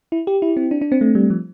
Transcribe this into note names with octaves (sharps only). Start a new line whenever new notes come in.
E4
G4
E4
C4
D4
D4
C4
A3
G3
F3